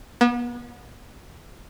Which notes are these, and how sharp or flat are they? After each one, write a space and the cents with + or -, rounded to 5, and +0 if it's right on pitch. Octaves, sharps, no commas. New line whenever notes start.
B3 -35